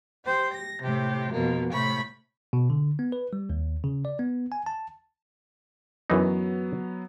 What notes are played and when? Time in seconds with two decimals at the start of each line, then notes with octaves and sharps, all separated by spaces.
0.23 G4 C5
0.54 A#6
0.83 A2 C3 G4
1.33 F2 B2 A#3
1.71 A2 C3 B5 C#6
2.53 B2
2.70 D3
2.99 B3
3.12 B4
3.33 G3
3.50 D#2
3.84 C#3
4.05 D5
4.19 B3
4.52 G#5
4.66 A5
6.10 F#2 E3 F#3 B3 D#4 F#4